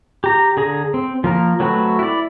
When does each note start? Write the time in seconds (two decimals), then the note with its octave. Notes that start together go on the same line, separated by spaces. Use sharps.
0.24 G4 A#5
0.57 D3 G#4 A#5
0.94 C4
1.24 F3 A#3 A#4
1.60 F#3 A3 C4 F#4 B4
1.99 E4 D5